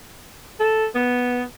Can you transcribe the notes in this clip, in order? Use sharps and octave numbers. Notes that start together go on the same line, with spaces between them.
A4
B3